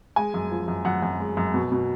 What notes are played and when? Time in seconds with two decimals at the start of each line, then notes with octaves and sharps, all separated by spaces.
0.16 G#3 G#5
0.34 F#2
0.51 F3
0.68 F#2
0.85 F#2 F#5
1.02 F#2
1.20 G#3
1.37 F#2
1.54 B2
1.72 B2